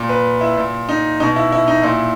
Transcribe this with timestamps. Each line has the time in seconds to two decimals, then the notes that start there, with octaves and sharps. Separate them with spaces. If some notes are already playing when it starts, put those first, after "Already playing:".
Already playing: A#2
0.09 B4
0.41 E4
0.57 A#2
0.89 D#4
1.20 B2 D#4
1.36 E4
1.52 E4
1.68 D#4
1.83 A#2 E4